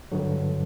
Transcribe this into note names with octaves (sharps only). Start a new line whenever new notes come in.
G2 D3 F#3